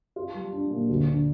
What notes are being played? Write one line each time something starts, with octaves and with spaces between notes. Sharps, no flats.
F4
G3
D4
A#2
D2
D3